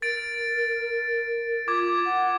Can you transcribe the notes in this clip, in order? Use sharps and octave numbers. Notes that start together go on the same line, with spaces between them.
A#4 A6 D7
F4 D6 G#6
F#5